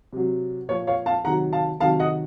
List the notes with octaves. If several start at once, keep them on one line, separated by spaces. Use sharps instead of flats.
C3 F#3
A#2 F3 C#5
C#5 F5
F5 A5
C3 D#3 F#3 F#5 A#5
F5 A5
C3 D#3 F#3 F5 A5
D#5 F#5